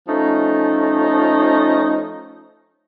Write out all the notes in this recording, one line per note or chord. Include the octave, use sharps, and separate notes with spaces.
F3 A3 C#4 D#4